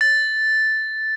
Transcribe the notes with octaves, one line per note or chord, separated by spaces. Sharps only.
A6